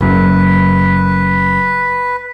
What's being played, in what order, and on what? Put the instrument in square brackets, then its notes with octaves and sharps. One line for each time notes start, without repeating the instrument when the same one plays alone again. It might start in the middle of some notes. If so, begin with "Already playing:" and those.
[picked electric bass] F#1 F#2 [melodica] B4